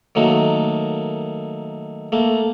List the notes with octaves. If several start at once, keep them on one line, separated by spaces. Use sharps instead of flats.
D#3 F#3 A3 A#3
A3 A#3